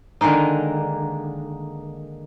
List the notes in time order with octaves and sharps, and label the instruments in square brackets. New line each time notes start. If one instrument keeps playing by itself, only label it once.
[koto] D3 D#3 G#3 A#3 D#4